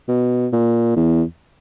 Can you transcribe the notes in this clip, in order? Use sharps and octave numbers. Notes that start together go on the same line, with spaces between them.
B2
A#2
E2